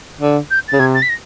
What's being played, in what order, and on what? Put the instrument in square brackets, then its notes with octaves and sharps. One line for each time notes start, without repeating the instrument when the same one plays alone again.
[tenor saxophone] D3
[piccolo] G6
A6
[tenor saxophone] C#3
[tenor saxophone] C3 [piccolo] G#6
[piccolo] A6
B6
A#6